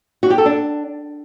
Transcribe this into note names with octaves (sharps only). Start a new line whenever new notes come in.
F#4
G4
A4
D4